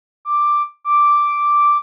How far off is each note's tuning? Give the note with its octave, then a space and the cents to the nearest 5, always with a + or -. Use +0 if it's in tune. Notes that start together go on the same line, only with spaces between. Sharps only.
D6 +5
D6 +0